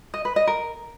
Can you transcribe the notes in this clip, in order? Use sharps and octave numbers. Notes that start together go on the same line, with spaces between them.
D#5
B4
D#5
A#4